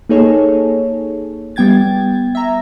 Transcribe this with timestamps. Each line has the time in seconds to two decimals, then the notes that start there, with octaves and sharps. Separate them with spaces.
0.09 A#3 D#4 G#4 A4 C#5
1.56 G3 B3 G5 G#6 A6
2.35 E5 A#5